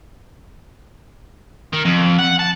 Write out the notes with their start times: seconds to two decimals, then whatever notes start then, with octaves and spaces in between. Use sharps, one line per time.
1.73 D#3
1.85 F2
2.19 F#5
2.39 A5